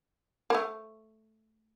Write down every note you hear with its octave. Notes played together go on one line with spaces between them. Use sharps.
A#3
A3